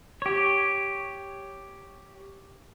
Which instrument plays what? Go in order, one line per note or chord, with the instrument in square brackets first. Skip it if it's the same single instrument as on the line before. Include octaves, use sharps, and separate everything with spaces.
[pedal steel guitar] G4 C#5